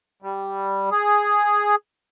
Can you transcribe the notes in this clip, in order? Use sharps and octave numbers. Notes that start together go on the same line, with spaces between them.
G3
G#4